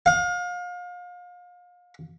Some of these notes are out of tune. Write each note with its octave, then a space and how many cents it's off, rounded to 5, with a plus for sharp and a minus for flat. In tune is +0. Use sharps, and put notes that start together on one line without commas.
F5 +35